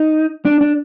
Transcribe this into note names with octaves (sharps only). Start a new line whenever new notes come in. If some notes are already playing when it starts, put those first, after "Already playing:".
Already playing: D#4
D4
D4